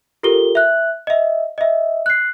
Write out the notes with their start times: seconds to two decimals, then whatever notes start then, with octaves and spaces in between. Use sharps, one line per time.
0.23 F4 G4 A4 A#4 G7
0.55 E5 F#6
1.07 D#5 E5
1.58 D#5 E5
2.06 F#6 C7